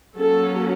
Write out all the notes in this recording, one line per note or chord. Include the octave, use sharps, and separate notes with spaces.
F#3 A#3 C#4 A4